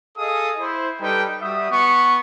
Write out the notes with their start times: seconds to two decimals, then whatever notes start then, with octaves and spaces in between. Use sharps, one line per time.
0.17 G#4 A4 D#5 F5 D#6
0.59 E4 C5
1.00 G3 D#4 A4 B4 G5
1.41 G3 F#4 E5 D#6
1.71 B3 C#6